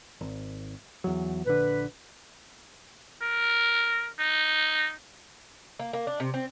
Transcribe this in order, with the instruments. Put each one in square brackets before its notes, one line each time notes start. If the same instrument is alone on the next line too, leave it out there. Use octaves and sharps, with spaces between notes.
[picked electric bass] G#1
E2 F#3
[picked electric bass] A#1 D3 [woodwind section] B4
[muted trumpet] A#4
D#4
[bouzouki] A#3
A#3
D4
C3
C4